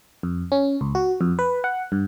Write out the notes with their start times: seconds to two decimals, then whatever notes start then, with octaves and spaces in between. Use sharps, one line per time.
0.23 F2
0.52 C#4
0.81 C#2
0.95 F#4
1.21 F2
1.39 B4
1.64 F#5
1.92 G2